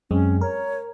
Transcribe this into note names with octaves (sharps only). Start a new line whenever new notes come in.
F#2 G#3 C4 C#4
A#4 C#5